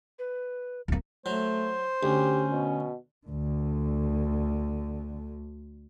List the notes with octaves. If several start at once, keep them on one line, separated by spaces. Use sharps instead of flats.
B4
D1 A#3
F#3 A3 C5
D2 C#4 G4
B2
D2 D3